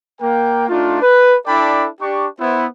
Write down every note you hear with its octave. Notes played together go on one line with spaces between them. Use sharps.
A#3 A#4 G5
A3 D4 D#4 F4
B4
D4 E4 A4 D5 G5 B5
D4 G4 C#6
B3 E4 C5